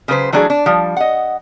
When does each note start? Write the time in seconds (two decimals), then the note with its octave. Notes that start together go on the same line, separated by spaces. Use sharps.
0.08 C#3 F#3 B4 C5
0.32 E3 F#3 A3 D4 G4 G#4
0.50 D4
0.66 F3 G3
0.97 D#5 F#5